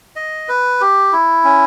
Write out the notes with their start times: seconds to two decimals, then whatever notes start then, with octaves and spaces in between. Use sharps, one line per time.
0.16 D#5
0.49 B4
0.81 G4
1.13 E4
1.44 C#4